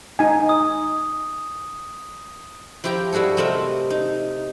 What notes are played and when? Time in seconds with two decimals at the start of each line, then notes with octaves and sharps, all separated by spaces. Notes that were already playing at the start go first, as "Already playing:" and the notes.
0.19 D#4 G#5
0.49 D#6
2.84 F3 E4 G4 G5 A#5
3.12 G3 E4 F#4 G#4 A4
3.37 C3 A3 C4 A4 A#4 D#5
3.90 D#4